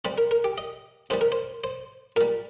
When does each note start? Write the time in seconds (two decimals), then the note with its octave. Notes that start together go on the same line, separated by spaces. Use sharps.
0.05 C3 G3 C5
0.18 A#4
0.31 A#4
0.44 G4
0.58 D#5
1.10 C3 D#3 G3 C5
1.21 A#4
1.32 C5
1.64 C5
2.16 A#2 G3 A#4